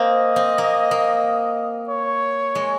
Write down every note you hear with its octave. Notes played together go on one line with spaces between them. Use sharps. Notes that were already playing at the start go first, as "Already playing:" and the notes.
Already playing: A#3 C4 D#5
C4
A#3
A#3
C#5
G#3